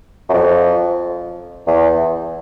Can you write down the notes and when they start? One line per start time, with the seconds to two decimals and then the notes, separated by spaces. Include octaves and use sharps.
0.29 F#2
0.33 F2
1.67 E2